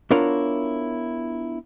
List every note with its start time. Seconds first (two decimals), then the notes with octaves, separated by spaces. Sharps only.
0.11 B3 D4 E4 F4 A#4 C#5